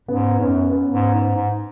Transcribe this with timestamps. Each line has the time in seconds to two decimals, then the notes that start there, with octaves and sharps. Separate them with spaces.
0.08 G#2 B3 C#4
0.40 F#2 B3 C#4
0.71 B3 C#4
0.93 G#2
1.14 G#2
1.35 G#2